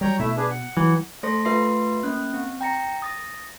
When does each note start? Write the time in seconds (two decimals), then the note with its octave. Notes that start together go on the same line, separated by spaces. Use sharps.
0.01 F#3 G3 C#5 G5 A#5
0.19 B2 A3 E4 E5
0.37 D4 G#4 B4
0.51 F#5
0.77 E3 F#3
1.23 A3 A4 C5 C6 A#6
1.45 A3 F4 B4 E5 C6 C7
2.03 A#3 C#4 F#6
2.34 C4
2.61 G5 A#5 A#6 C#7
3.02 D#6 A6 A#6